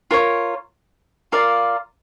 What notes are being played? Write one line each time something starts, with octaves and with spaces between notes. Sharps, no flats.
F4 A#4 C#5
F4 A#4 D5 F5